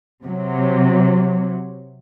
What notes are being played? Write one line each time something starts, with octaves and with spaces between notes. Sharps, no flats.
C3 F#3